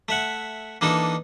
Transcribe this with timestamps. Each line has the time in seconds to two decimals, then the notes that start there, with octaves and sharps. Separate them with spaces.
0.08 A3 E5 F#5
0.81 E3 A#3 D4 D#4 A4